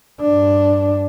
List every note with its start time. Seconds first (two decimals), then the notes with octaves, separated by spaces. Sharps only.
0.21 G2 D4